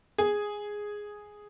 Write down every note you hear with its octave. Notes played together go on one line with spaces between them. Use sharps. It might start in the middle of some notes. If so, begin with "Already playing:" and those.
G#4